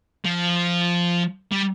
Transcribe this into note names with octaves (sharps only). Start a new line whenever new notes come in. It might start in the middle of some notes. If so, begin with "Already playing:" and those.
F3
G3